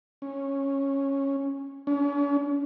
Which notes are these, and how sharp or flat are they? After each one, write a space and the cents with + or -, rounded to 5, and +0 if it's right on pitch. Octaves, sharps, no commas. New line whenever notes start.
C#4 -10
C#4 +45